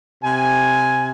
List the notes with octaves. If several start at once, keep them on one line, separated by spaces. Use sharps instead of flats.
C3 G#5